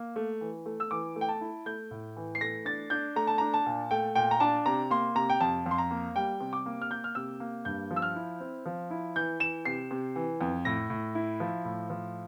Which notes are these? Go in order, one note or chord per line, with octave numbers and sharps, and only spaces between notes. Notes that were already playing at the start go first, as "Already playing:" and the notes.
Already playing: A#3
A3
E3
A3
E6
E3 D6
A3
G5
A5
E4
A3 G6
A2
E3
C7
A3 A#6
D4 A6
D4 G6
A3 A#5
A5
D4 A#5
A5
A#2
A3 G5
A#2 G5
A#5
D4 A5
C3 A#5
A#3 C6
C3 A#5
G5
F2 A5
F2
C6
A#5
A#3
G3 G5
C3
D6
A#3
F6
A#3 G6
F6
C3 E6
A#3
G2 G6
F3
E6
F6
E4
C4
F3
E4
E3 G6
E3 E7
C3 C7
C3
E3
F2
A2 A#6
A2
E4
F3
A2
F3